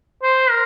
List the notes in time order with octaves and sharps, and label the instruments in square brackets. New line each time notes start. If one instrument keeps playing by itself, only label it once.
[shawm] C5
A#4